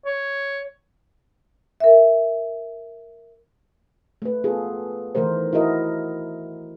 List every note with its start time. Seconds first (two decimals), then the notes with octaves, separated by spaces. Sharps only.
0.06 C#5
1.80 A#4 E5
4.22 A3 B4
4.44 B3 F4 G#4 A4
5.15 D#3 E3 A3 A#4 C5
5.53 E4 F#4 A#4 D#5